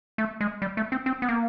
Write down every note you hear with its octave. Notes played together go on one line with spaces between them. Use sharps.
A3
G#3
G3
A3
C4
C4
B3
A#3